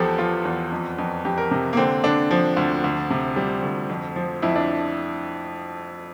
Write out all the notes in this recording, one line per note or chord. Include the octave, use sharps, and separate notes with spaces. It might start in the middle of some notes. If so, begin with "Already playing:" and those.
Already playing: E2 F3 G4 A4
F3 F4
E2
F2
F2
F2 G4
A#4
C3
A#3
D3 C4
D3 D4
F3
D2
D2
C3
G3
D2
F2
F3
F2 E4
D4